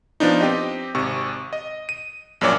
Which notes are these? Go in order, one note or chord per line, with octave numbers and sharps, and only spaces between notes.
F3 B3 D4 D#4
C4 G4 D#5
G#1 C3 C#6
D#5
D#7
A#1 F#2 A#2 C#5 D5 D6